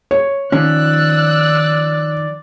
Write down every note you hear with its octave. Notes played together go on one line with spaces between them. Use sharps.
C#5
D#3 F3 C#4 D5 E6 F#6